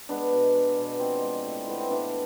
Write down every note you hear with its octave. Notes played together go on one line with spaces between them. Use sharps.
G#3 B3 D4
B2
G#3
B2
F3 C4
G#3
A2
A2 B3
C4
E3 B3 D4